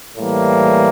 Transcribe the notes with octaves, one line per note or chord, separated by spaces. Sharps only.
A2 E3 G3 A#3